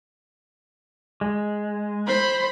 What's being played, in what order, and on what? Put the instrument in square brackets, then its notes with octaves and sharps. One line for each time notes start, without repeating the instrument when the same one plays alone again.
[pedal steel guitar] G#3
[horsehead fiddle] C5 B5